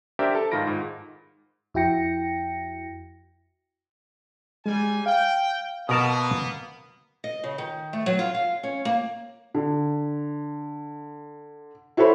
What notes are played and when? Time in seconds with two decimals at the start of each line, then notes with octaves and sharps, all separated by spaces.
0.19 D4 G4 A#4 C5 D5 E5
0.35 A4 A5
0.51 G#2 D#3 F4 B5 A#6 D7
0.67 G#2
1.74 F2 E4 F#4 G5 A#6 C#7
4.66 G3 G#3 G#5
5.06 F5 G5
5.89 B2 A#3 B3 A#4 A5 B5 D#6
7.24 D#5
7.44 C#3
7.58 D#3
7.93 A3
8.06 F#3
8.19 F4
8.34 F5
8.63 C#4
8.85 A#3
9.54 D3
11.97 E4 F#4 A4 C5 C#5 B5